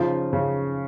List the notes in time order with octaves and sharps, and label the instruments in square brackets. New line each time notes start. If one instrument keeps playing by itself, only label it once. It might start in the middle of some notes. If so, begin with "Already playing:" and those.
Already playing: [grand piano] C#3 [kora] F3 C#4 D#4
[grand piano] C#3